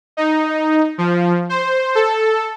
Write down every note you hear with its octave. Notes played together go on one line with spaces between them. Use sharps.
D#4
F3
C5
A4